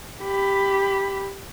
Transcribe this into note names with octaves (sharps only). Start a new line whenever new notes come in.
G4 B5